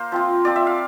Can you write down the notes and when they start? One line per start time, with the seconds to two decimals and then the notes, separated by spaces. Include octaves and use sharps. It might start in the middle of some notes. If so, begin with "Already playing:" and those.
Already playing: A#3 A#4 C5
0.12 F3 C4 F4
0.45 F3 C4 F4 D5
0.56 E5
0.67 F5